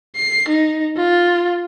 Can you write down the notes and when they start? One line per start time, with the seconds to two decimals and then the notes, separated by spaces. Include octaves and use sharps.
0.15 C7
0.48 D#4
0.97 F4